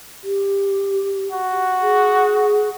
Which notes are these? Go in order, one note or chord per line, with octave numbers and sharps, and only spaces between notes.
G4
F#4
G#4